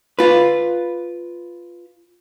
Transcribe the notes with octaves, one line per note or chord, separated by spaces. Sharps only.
F4 B4